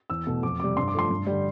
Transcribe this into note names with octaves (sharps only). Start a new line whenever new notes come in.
E2 E6
B2 A3
F2 D6
C3 G3 D6
G2 C6
D6
F3 A3 C6
G2
D3 G3